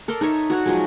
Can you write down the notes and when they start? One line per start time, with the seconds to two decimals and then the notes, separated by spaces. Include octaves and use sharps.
0.08 A4 A#4 D5 C6
0.21 D#4 A4 C#5 E5
0.50 F#4 C#5 F#5
0.65 F3 F#3 G#3